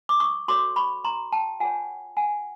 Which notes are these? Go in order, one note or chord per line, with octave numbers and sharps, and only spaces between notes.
D6
C#6 D#6
F#4 A4 C#5 C6 D6
B5 C#6
A#5 C6
G5 A5
F4 G#4 C#5 F#5 G#5
F#5 G#5